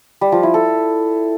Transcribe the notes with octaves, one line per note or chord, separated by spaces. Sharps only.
G3
F3
E4
A4